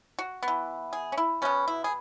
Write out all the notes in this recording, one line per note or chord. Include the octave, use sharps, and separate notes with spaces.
F#4
B3
E3
G#4
C#4
E4
B2 B3 C#4
E4
G#4